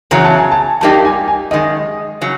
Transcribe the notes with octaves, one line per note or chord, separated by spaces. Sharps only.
E2 C#3 F#3 A#5
A5
G#5
A5
A#2 G3 A#3 D#4 G4 A5
G#5
G#5
F#2 D#3 G#3 D#5
C#3 F#3